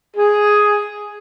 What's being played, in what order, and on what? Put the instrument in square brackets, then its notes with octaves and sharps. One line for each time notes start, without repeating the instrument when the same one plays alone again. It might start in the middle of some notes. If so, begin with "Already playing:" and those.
[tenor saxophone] G#4